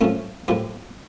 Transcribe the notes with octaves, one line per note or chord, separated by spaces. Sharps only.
A2 F3 A3 C#4
A2 F3 E4 G4